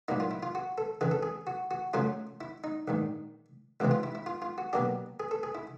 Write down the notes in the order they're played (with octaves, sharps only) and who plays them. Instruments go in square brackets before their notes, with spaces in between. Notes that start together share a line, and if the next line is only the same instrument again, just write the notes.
[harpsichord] A#2 F#3 A#3 D#4 E4
F4
E4
F4
F#4
A4
F2 C#3 E3 G#4
A4
G#4
F#4
F#4
F#2 C#3 F#3 A3 C#4 F4
E4
D#4
A#1 G#2 D#3
C#2 C3 E3 G#3 C4 E4
F4
E4
E4
F4
F4
F#4
B2 F#3 A#3 D4 G4
G#4
A4
G#4
E4